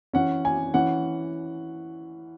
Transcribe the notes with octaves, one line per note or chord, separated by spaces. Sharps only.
E3 C#4 F#5
G#5
E3 C#4 F#5